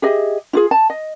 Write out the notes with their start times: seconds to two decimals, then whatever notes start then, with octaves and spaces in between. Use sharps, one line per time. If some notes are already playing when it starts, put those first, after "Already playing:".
0.02 G4 G#4 D#5 E5
0.53 E4 F4 G#4
0.71 A5
0.90 D#5